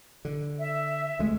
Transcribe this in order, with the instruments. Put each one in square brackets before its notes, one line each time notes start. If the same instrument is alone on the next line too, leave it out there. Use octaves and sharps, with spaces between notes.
[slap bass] D3
[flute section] E5
[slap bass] D2 G#3 A3